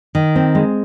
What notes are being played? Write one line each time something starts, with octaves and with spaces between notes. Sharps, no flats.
D#3
C4
G#3